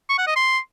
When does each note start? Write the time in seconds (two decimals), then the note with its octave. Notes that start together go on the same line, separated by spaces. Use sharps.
0.09 C#6
0.18 F#5
0.27 D#5
0.36 C6